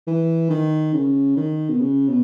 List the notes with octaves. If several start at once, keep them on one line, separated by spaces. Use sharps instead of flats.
E3
D#3
C#3
D#3
B2
C#3
B2